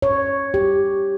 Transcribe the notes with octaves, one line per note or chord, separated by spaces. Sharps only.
C#5
G4